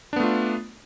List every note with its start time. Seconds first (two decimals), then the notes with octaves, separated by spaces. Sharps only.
0.13 D4
0.16 B3
0.20 A3
0.23 F4